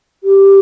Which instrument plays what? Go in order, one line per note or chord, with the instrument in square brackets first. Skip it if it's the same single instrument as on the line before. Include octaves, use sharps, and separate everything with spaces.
[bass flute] G4